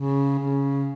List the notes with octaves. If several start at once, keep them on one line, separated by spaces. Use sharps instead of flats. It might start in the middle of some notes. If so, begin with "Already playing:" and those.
Already playing: C#3
C#3